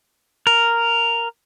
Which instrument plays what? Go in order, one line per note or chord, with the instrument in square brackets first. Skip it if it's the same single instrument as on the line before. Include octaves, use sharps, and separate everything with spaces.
[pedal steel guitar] A#4